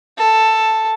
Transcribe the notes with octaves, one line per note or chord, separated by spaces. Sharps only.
A4